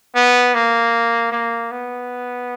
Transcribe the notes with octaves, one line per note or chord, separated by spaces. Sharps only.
B3
A#3
A#3
B3